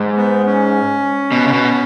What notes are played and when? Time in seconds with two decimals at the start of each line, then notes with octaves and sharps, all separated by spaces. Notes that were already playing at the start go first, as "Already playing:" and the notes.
Already playing: G#2
0.16 B3
0.46 C#4
1.32 B2
1.48 C#3
1.53 B2